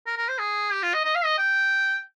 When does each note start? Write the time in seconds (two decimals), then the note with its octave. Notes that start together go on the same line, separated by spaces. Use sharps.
0.07 A#4
0.17 A#4
0.28 C5
0.39 G#4
0.72 G4
0.83 F4
0.94 D#5
1.05 D#5
1.15 F5
1.25 D#5
1.38 G5